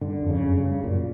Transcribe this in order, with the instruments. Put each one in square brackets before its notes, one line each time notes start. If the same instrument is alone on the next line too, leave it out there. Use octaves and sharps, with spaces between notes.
[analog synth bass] G2 [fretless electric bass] D3
[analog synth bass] F2
[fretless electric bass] C#3
[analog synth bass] F#2
[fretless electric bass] C#3
[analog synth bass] G2
[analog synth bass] F#2 [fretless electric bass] A#2